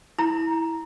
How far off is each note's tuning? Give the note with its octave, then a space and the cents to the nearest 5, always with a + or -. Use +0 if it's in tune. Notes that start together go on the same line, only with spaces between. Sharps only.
E4 -10 A#5 +10